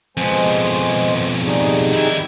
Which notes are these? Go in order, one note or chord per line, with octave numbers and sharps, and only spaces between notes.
F2 B2 G#3 C5 G#5
G3 D#4 G#4
D#3 E4